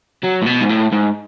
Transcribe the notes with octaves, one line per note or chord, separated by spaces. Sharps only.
F#3
A2
B2
G#2
A2
G#2